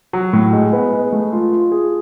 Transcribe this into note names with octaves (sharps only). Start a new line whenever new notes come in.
F#3
A2
G#3
B3
G#3
A3
F4
F4
G#4